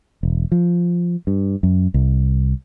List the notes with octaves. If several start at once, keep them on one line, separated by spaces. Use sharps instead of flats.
E1
F3
G2
F#2
C2